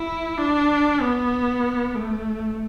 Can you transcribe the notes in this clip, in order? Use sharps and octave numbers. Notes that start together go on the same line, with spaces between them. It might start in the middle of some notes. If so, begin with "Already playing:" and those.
Already playing: E4
D4
B3
A3